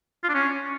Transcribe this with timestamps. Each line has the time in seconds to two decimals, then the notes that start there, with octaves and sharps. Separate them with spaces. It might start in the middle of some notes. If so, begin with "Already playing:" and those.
0.24 F4
0.29 D4
0.34 C#4